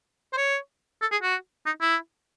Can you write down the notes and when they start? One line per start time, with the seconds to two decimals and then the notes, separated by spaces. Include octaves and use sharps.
0.33 C5
0.37 C#5
1.01 A4
1.12 G#4
1.22 F#4
1.66 D#4
1.81 E4